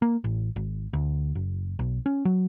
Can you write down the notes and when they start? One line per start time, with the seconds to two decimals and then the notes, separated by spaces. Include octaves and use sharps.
0.02 A#3
0.24 A1
0.56 G#1
0.93 D2
1.35 F#1
1.79 B1
2.06 C#4
2.25 F#3